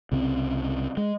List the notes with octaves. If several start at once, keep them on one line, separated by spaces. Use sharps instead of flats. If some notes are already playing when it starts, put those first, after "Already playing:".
C2 C#3 C4
G#3